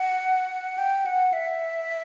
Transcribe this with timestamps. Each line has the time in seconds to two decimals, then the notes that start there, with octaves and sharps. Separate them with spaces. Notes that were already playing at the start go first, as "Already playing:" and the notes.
Already playing: F#5
0.78 G5
1.06 F#5
1.33 E5